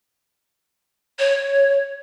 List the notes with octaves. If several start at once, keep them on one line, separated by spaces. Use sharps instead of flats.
C#5